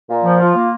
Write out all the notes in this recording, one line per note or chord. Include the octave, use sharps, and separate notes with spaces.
A#2
F3
F4
A#3